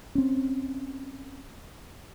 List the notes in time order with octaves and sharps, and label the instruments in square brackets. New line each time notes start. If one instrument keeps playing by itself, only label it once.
[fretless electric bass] C4 C#4